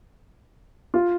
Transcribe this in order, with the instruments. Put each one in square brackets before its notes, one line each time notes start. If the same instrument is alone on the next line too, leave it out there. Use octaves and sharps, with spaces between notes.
[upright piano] F4